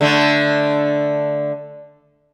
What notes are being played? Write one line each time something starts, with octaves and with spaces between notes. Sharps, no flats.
D3 A3